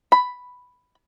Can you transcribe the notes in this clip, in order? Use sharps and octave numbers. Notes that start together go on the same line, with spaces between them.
B5